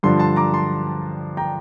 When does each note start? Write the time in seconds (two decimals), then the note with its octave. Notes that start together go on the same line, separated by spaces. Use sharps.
0.03 G2 D3 F3 A5 C6
0.20 A5 C6
0.36 A#5 D6
0.54 A5 C6
1.37 G5 A#5